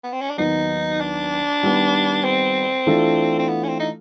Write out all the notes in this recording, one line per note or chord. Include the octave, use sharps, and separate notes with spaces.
B3
C4
C#4
D4
D#2 D#3 F#3 B3 D#4
D4
D#3 G3 B3
C4
E3 A3 D4 F4 A4
C4
B3
C#4
C4
D#4